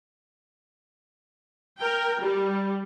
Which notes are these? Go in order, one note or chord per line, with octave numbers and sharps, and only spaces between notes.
A#4 G5
G3